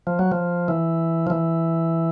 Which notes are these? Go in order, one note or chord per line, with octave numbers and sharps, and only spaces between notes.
F3
F#3
F3
E3
F3
E3